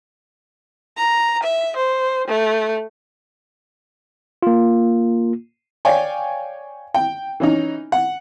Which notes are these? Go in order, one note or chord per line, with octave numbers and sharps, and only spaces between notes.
A#5
E5
C5
A3
A#3 F4
C#5 D5 F5 G5 G#5
G5
E3 C#4 D#4
F#5